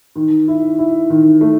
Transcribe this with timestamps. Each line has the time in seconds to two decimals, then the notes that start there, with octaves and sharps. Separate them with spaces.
0.16 D#3
0.48 E4
0.79 E4
1.10 D#3
1.41 A3